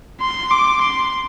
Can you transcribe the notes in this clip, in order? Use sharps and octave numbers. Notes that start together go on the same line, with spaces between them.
C6
D6
C6